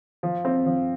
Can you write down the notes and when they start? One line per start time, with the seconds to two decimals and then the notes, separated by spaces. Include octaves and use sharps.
0.23 F3
0.45 C4
0.66 F3